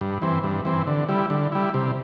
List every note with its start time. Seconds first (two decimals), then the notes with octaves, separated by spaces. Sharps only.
0.01 G2
0.22 E3 C4
0.44 G2
0.65 E3 C4
0.87 D3
1.09 G3 E4
1.30 D3
1.52 G3 E4
1.74 C3